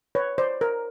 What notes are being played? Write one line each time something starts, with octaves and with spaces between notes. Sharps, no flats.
B4 C#5
C5 D5
A#4